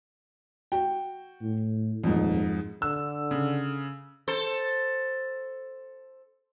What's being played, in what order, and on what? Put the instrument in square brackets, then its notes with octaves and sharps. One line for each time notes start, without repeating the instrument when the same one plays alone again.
[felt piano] F#4 G5
[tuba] A2
[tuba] D#1 [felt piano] F2 G#2
[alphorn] D3 [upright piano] E6
[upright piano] C#3
[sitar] A4 C5